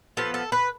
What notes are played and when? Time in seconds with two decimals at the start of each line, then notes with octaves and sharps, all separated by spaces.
0.17 F3 B3 A4
0.34 A4
0.52 B4